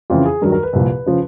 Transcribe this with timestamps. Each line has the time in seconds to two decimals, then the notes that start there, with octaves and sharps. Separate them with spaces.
0.10 F2 C#3 E3 F4
0.26 G#4
0.41 G2 D#3 F#3 A#4
0.52 A#4
0.63 B4
0.73 C2 A#2 F3
1.06 C#3 F3